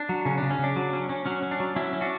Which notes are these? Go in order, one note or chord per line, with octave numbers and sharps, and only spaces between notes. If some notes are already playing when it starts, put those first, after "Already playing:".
Already playing: D4
F#3
C#3 C#4
C#3 D4
C#4
C#3 D4
F#3
C#4
C#4
F#3 C#4
C#4
D4
F#3
F#3 C#4 E4
C#4
D4 F#4